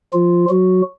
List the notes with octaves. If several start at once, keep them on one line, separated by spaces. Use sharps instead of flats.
F3 F4
F#3 F#4